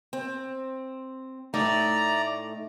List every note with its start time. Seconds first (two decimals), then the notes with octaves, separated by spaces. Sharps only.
0.13 C4
1.54 A2 A3 D#4 D5 A#5